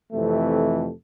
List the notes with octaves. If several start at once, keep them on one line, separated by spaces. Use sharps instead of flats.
F2 C3 E3 A3